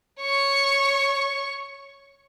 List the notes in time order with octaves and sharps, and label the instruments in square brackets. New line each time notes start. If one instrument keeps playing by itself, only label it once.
[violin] C#5 C#6